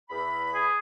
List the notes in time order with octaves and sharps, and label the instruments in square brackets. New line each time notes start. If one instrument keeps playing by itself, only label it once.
[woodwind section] E2 B5
[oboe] G#4